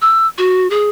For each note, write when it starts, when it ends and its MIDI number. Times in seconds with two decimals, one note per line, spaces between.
0.02 0.27 88
0.38 0.68 66
0.70 0.90 68